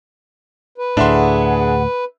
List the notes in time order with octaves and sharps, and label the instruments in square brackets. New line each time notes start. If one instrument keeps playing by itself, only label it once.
[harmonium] B4
[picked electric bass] D2 A2 [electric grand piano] D4 E5 C6 [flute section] G#4 F#5